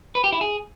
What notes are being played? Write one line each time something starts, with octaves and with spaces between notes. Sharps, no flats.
B4
G4
E4
G#4